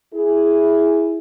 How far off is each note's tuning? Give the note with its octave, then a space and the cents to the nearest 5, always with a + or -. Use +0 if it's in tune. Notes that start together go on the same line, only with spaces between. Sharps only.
E4 +0 G#4 +0